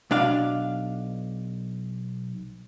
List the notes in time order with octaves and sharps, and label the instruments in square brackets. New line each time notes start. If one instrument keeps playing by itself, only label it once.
[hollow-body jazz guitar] B1 D4 F5